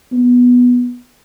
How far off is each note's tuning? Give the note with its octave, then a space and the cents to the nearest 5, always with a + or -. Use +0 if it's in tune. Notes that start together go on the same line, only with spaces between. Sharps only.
B3 -5